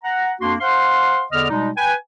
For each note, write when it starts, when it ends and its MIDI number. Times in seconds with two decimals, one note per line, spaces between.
0.04 0.31 78
0.04 0.31 82
0.40 0.54 41
0.40 0.54 58
0.40 0.54 62
0.40 0.54 66
0.40 0.54 84
0.60 1.22 72
0.60 1.22 77
0.60 1.22 78
0.60 1.22 84
1.32 1.46 40
1.32 1.46 50
1.32 1.46 74
1.32 1.46 75
1.32 1.46 89
1.50 1.69 47
1.50 1.69 55
1.50 1.69 56
1.50 1.69 63
1.77 1.94 71
1.77 1.94 79
1.77 1.94 80